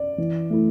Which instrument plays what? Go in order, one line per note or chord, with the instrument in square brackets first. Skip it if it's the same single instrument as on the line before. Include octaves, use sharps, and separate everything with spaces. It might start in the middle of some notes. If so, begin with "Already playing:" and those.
Already playing: [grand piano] D5
E3
A3 E4